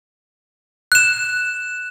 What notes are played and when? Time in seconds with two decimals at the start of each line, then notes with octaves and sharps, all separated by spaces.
0.92 F#6 E7